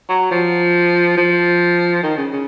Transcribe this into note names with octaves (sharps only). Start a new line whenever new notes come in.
F#3
F3
F3
D#3
C#3
C#3